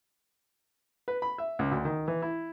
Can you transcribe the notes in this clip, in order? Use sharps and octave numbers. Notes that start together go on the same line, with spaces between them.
B4
B5
E5
C#2
D2
D#3
E3
E4